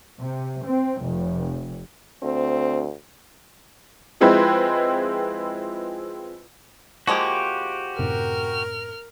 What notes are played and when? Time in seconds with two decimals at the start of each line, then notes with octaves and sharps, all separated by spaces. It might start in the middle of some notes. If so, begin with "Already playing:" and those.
0.19 C3
0.64 C4
1.02 F1
2.23 D2 C4
4.21 F3 G#3 C4 E4 B4 C5
7.07 F3 G#3 A#3 F#4 G4
7.99 F#2 A2 C3 A#4 F6